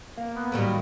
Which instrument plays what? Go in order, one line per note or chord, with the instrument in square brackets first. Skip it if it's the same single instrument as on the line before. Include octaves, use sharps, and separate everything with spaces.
[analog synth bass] A#3
[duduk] B3
[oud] A2 F#3 G3 [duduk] D#3